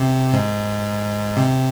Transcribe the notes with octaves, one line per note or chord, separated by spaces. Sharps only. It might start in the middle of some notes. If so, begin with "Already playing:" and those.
Already playing: C3
G#2
C3